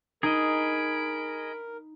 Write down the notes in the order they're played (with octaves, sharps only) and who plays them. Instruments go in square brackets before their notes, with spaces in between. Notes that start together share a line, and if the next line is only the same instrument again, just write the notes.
[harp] D#4 [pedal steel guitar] G#4 D#5 [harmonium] A#4 [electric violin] B5 D7